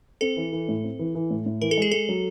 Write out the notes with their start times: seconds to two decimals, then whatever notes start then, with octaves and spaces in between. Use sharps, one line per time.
0.21 C4 A4
0.37 E3
0.53 E3
0.68 A2
0.84 C4
0.99 E3
1.15 E3
1.31 A2
1.46 A2
1.61 E3 A#4
1.71 A4
1.77 G#3 G#4
1.92 G#3 A4
2.09 F#3